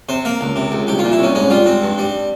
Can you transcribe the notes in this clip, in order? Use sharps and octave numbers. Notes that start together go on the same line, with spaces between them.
C3 C5
A#3 A#4
C#2
C3
C#2
C2 G4
F4
A#2
E4
C2 C#4
G#2 C#4
G3 F4
G#2 C4
G2
G3